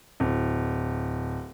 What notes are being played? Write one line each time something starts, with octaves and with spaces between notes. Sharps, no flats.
D1